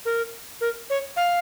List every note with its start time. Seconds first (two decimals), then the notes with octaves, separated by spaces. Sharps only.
0.05 A#4
0.61 A#4
0.90 C#5
1.16 F5